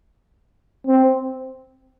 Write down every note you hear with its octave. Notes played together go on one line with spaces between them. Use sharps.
C4